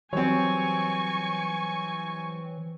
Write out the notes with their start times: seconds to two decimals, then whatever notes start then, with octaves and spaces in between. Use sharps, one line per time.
0.13 E3 F#3 G3 C4 C#5 G#5 C#6